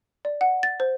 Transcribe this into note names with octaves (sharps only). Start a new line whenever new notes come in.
D5
F#5
A6
C5